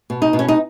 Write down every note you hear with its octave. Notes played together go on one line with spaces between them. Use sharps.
B2
D#4
B2
C#4
D#4